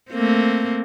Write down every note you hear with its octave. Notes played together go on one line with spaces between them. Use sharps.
A3 A#3 C4